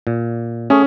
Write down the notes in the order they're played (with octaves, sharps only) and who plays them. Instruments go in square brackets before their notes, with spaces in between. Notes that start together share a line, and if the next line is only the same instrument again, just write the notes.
[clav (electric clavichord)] A#2
[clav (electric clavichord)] A3 G#4 C#5 [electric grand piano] C#4